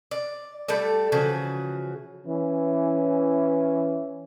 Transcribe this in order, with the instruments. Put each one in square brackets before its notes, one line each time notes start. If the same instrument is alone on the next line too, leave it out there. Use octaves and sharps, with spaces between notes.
[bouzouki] D5
G3 A3 A4 D5
C#3 E3 F3 F#4
[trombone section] E3 C#4